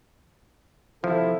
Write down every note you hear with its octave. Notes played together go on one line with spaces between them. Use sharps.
C3 F3 E4 A4